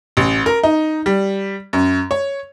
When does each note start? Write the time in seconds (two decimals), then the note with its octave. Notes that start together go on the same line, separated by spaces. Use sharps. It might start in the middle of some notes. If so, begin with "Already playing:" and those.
0.17 A1
0.46 A#4
0.63 D#4
1.06 G3
1.73 F#2
2.11 C#5